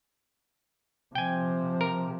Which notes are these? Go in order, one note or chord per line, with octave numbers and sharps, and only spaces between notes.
C3 F3 G5 G#5
A#4